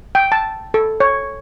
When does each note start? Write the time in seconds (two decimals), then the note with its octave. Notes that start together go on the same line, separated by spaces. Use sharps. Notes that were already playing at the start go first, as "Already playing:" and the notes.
0.15 G5
0.32 A5
0.74 A4
1.00 C#5